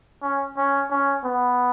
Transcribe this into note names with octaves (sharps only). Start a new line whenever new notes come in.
C#4
C#4
C#4
B3